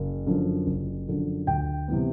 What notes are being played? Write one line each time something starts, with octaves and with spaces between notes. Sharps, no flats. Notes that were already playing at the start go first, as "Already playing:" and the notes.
Already playing: F#1
F#2 D3 F3
F#1
F#2 D3 F3
D2 G5
C3 E3 G3 B3